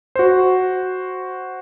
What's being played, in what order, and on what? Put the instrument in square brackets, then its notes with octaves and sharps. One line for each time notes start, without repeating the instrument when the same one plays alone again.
[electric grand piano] F#4 C5